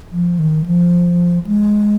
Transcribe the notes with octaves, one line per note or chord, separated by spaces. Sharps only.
F3
D#3
F3
G#3